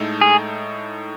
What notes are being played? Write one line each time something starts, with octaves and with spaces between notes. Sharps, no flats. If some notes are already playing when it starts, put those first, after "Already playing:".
Already playing: A2 G#3 D#4 A4
G#4